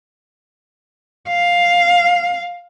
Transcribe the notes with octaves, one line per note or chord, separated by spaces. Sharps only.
F5